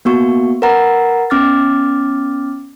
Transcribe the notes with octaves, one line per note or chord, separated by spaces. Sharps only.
A#3 B3 F#4 C#6
A#4 B4 F#5 A#5 A6
B3 C#4 D6 F6 A6